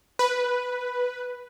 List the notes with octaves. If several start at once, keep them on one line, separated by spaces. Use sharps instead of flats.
B4